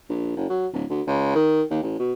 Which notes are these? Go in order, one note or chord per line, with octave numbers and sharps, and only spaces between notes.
A#1
F#1
F#3
D1
D2
C#2
D#3
D#2
A1
B2